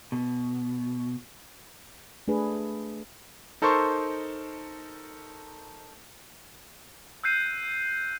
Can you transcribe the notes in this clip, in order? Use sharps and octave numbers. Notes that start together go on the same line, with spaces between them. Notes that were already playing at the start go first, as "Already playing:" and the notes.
B2
A3 D4 G#4 B4
D#4 A4 A#4 C5 C6 C#6
E6 F#6 G6 C7 D#7